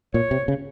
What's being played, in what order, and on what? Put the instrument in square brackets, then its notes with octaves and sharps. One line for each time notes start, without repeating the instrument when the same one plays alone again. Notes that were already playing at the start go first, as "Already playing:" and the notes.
[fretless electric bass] A#2 [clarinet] C#5
[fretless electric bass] C3
C#3